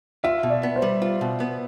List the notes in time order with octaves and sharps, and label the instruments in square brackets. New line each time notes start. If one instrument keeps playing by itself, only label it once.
[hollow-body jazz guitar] F4 [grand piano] E5
[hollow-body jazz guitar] B2
[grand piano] D5
[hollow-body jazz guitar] B3
[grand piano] C5
[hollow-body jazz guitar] G3
F4
B2
B3